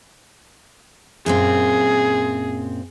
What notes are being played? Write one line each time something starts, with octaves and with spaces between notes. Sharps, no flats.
F#2 A#2 C4 G#4